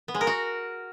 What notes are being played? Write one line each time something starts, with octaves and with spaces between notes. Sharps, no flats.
B3
G#3
A#4
F#4